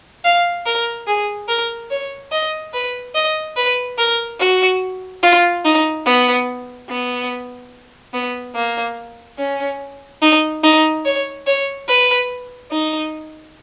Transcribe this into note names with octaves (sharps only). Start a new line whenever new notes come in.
F5
A#4
G#4
A#4
C#5
D#5
B4
D#5
B4
A#4
F#4
F4
D#4
B3
B3
B3
A#3
C#4
D#4
D#4
C#5
C#5
B4
D#4